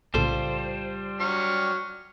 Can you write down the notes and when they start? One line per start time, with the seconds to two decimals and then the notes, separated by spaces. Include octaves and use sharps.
0.14 B1 A2 C#3 G3 F4 A4 C5
1.20 F#3 C#6 F6